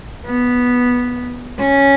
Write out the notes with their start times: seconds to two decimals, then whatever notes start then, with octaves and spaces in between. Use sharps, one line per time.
0.26 B3
1.58 C#4